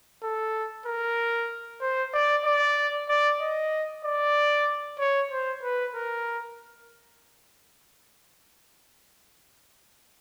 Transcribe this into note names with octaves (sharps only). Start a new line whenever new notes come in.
A4
A#4
C5
D5
D5
D5
D#5
D5
C#5
C5
B4
A#4